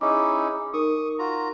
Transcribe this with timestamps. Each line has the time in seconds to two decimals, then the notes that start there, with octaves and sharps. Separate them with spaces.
0.01 C#4 D#4 E4 G#4 D#5 D6
0.73 D#4 A#4 C#6 D#6
1.19 F4 F#4 A#5